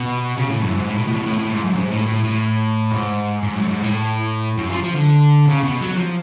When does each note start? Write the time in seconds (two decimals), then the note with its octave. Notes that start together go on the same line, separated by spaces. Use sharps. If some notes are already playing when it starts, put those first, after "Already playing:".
Already playing: B2
0.37 C#3
0.50 A2
0.62 F#2
0.75 G#2
0.88 A2
0.98 B2
1.08 A2
1.17 B2
1.26 A2
1.39 A2
1.52 G#2
1.65 F#2
1.77 G#2
1.90 A2
2.07 A2
2.24 A2
2.91 G#2
3.42 G#2
3.55 F#2
3.68 G#2
3.81 A2
4.58 F#2
4.70 F3
4.83 F3
4.95 D3
5.46 C#3
5.63 B2
5.80 F#3
5.97 F3